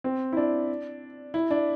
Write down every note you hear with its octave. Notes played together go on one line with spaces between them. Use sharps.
C4
E4
D4
E4
D4